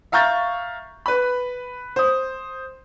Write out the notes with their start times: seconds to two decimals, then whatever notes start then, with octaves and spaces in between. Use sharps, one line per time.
0.12 E5 F5 A#5 C#6 G6 A6
1.06 B4 B5
1.96 C5 D#6